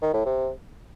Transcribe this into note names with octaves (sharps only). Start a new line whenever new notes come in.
D#3
A2
C3